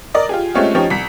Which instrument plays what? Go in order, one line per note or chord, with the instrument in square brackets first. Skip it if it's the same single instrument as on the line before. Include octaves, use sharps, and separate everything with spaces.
[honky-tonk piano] A#4 D5 D#5
F4 G4 G#4
G#3 A3 C4 C#4 F4 G4
F3 C#4 D#4 G4
C2 B6